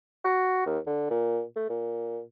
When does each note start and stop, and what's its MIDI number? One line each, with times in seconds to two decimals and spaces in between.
0.25 0.63 66
0.66 0.79 39
0.87 1.10 50
1.10 1.43 46
1.56 1.68 57
1.70 2.20 46